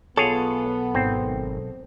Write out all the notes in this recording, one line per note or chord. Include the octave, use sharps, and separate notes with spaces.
B1 B3 F4 G#4 A4 C#5
G#1 C4